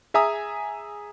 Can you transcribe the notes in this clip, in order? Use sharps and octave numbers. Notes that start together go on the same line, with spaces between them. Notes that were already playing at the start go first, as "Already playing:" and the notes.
G#4 E5 G#5 A#5 D#6